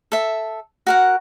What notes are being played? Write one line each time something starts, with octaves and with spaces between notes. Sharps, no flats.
A4 E5
F#4 A#4 F#5